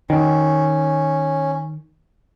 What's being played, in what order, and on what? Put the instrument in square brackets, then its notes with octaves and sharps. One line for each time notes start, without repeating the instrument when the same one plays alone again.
[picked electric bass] D#3 [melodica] C#4